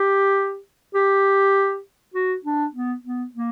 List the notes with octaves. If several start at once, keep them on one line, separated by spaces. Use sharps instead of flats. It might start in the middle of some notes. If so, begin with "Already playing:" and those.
Already playing: G4
G4
F#4
D4
B3
B3
A#3